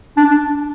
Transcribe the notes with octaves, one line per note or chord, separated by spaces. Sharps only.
D4